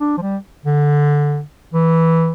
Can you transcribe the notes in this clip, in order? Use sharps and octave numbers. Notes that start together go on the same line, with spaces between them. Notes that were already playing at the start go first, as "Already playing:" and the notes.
D4
F3
G3
D3
E3